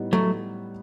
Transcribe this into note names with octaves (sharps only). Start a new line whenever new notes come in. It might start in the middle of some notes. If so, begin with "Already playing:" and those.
Already playing: A2 G3 B3 D#4
F#3 A3